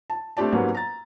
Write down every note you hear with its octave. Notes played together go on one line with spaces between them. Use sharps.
A5
A3 C4 D4 G4 D5 A5
G#2 F#3 G3 A#3 B3 C#4
A#5 A6